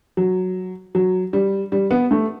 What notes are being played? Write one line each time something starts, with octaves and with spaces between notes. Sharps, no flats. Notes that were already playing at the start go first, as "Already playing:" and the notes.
F#3
F#3
G3
G3
B3
A3